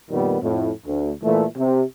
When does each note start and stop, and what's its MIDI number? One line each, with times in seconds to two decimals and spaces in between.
0.11 0.39 41
0.11 0.39 46
0.11 0.39 51
0.11 0.39 55
0.11 0.39 59
0.41 0.71 41
0.41 0.71 45
0.86 1.11 38
1.23 1.46 46
1.23 1.46 52
1.23 1.46 57
1.57 1.82 48